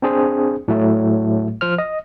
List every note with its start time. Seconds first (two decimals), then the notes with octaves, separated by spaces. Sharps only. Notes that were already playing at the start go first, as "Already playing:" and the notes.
0.02 C4 D4 G#4 C5
0.68 A2 F#3 A3
1.61 F3 C5 F6
1.78 D#5